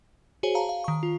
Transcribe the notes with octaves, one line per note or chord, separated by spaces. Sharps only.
F#4 G#4 C5 C#5 G#5
F5 A5 A#5
F5
D#3 C#6
F4